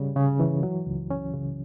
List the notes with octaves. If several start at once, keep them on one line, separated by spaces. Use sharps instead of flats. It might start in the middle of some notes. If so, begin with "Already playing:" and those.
Already playing: C#3 G3
C#3
E3
F#3
C#2
C#4
C#3